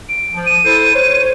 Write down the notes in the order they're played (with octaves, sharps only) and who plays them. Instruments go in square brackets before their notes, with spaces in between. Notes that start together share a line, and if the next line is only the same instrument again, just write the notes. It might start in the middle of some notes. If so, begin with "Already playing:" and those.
[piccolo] D7
[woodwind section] F3
[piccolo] D#7
[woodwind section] E4 A4 C5
C5 C#5